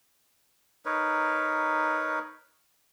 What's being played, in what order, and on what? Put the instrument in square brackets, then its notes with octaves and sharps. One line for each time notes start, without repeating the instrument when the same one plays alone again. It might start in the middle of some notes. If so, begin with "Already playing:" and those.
[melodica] D#4 A#4 B4 C#5